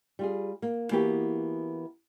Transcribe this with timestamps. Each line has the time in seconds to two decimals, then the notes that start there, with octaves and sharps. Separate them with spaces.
0.19 G3 F4 G#4
0.62 A#3
0.91 E3 A#3 B3 F#4 G4